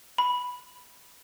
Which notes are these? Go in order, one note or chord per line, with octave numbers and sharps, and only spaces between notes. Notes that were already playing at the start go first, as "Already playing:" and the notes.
B5